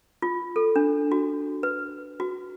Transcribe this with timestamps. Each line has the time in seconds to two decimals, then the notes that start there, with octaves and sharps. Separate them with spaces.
0.22 F4
0.56 A4
0.76 D4
1.12 F#4
1.63 B4
2.20 F#4